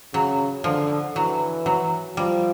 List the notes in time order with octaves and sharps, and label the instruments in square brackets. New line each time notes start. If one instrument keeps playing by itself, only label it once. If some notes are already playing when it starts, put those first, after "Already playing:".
[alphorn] C#3 [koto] F#3
[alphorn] D3 [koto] F3
[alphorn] E3 [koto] F#3
[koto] F#3
[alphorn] F3 [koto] G3